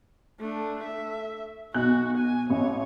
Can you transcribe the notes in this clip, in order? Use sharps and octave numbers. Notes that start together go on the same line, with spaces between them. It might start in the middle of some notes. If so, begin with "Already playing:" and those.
A3 D4
E5
B1 F#4 F#6
G#5
A1 C#5